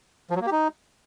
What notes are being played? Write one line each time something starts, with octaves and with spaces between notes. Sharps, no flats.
F3
F#3
A#3
G4
D#4